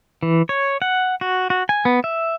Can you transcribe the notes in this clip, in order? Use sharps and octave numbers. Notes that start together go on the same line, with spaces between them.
E3
C#5
F#5
F#4
F#4
G#5
B3
E5